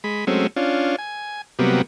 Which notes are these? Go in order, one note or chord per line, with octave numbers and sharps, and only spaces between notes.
G#3 B5
F#3 G#3 A3 C4 C#4
C#4 D4 F4
G#5
C3 F#3 G3 A#3 B3